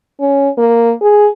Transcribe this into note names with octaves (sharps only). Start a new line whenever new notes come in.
C#4
A#3
G#4